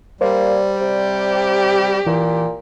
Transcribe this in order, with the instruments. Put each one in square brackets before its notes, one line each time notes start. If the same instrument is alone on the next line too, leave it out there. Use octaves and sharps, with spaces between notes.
[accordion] G3 [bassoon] A#3 [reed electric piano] C5 D5
[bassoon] C3 [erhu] G4
[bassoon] A#2 [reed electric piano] E3